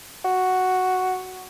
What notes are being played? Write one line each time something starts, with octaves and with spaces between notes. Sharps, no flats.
F#4